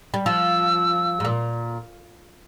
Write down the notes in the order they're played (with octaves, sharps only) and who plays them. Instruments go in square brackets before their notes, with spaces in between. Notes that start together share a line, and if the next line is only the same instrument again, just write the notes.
[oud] G3
[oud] F3 [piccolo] E6
[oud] G#2
A#2